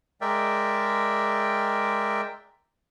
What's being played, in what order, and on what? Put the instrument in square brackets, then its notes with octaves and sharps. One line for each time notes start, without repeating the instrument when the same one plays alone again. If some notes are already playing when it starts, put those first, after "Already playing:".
[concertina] G#3 A#4 D5 E5 G5